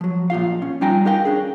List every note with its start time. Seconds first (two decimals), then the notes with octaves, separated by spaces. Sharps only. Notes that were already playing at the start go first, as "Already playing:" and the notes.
0.01 F3 F#3
0.30 A#2 F3 F4 F5
0.62 C#4
0.81 G3 D#4 F4 G5 G#5 A#5
1.05 D#4 G4 A#4 F5 G5
1.25 C#4 D4 G#4